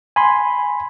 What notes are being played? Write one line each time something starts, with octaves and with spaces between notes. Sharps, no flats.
G#5 B5 C6